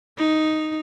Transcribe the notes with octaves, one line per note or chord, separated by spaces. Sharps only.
D#4